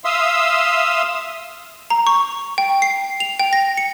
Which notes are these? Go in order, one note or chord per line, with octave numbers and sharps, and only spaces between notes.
E5 F5 C6 D#6 E6
A#5
C#6
G5
C7
F7
G5
A#6
C#7